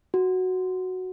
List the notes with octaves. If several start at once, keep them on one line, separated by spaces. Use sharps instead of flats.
F#4